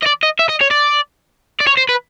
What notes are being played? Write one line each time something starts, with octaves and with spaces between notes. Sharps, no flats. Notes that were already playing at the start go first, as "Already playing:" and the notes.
D#5
D5
D#5
E5
D#5
C#5
D5
D5
C#5
C5
B4